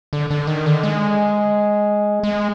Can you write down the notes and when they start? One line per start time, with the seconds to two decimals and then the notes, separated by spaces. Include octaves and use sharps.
0.13 D3
0.30 D3
0.47 D#3
0.66 D3
0.83 G#3
2.23 G#3